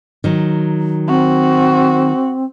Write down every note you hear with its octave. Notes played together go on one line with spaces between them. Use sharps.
D#3 F#3
C4 F#4